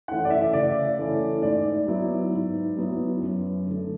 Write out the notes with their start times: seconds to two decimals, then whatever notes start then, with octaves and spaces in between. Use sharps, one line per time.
0.08 E3 A3 C#4 E4 F#5
0.25 D5
0.30 E5
0.53 C#3 D5
0.98 E3 A3 C#4 E4
1.42 G#2 D5
1.87 F#3 B3 E4
2.32 G#2
2.77 F#3 B3 E4
3.21 F#2
3.66 D3 A3